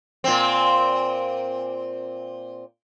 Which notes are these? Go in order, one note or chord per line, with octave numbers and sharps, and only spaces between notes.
A#2 C4